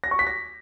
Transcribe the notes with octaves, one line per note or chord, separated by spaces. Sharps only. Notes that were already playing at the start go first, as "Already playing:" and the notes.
A#6
C#6
B6
A#6